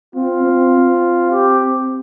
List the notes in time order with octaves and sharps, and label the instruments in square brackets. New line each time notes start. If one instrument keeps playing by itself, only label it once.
[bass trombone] C4 [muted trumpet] F4
[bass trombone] C4
C4
[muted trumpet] G4